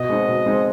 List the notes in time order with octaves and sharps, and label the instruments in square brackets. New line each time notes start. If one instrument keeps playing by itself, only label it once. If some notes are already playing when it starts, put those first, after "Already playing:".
Already playing: [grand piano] B2 [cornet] D#5
[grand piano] G#3 C4 D#4
B2
G#3 C4 D#4